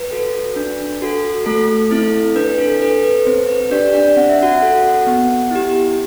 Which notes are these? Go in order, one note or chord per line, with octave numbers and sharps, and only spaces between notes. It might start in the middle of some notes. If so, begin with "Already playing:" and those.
Already playing: B4
F#4 A4
D4
F#4 A4
A3 A4
C4 E4 A4
D4 B4
A4
A4 B4
B4
C4 C5
B4
D4 G4 D5
D4 D5
C4 F#5
E5
F#4 F#5
F#4 A4
B3
E4 G4